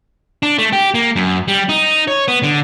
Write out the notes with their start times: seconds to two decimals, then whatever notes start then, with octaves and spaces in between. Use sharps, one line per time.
0.43 D4
0.59 A3
0.73 G4
0.94 A#3
1.16 F#2
1.48 G3
1.69 D#4
2.08 C#5
2.28 B3
2.43 D3